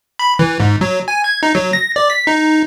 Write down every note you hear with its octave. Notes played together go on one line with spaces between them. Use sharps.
B5
E3
G#2
F#3
G#5
G#6
D#4
F#3
A#6
D5
B6
D#4